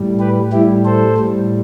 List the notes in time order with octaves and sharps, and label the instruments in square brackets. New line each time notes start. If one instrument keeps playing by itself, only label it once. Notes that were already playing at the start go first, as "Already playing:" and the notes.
Already playing: [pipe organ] A2 G3
G4 B4
A2 G3 E4 G4
A4 C5
A2 G3